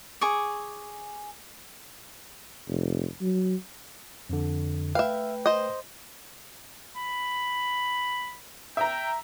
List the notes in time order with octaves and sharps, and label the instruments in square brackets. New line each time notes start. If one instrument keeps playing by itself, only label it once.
[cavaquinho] G#4 C#6 D6
[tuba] F1
F#3
[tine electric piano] F2 D3
[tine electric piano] A3 B4 G5 [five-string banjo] E5 F5
[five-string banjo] C5 D#5
[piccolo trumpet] B5
[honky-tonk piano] E5 A#5 [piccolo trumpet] G5